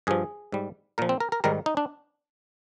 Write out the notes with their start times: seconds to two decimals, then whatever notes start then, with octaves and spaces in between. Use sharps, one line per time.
0.07 G2 F3 G#4
0.52 G#2 G3
0.98 A#2 F3 A#4
1.09 C4
1.20 A#4
1.32 A#4
1.44 G#2 D#3 G3 A#4
1.66 D#4
1.77 D4